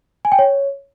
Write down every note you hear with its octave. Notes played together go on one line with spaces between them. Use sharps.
G#5
G5
C#5